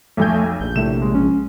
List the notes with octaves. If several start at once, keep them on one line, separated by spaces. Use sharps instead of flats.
B1 F2 A3 G#5 G6
A#1 G6
A#1 A2 C3 A3 E7
G#3
C#4